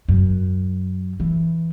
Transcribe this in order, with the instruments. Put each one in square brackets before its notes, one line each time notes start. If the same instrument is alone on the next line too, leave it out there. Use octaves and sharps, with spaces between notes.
[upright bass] F#2
E3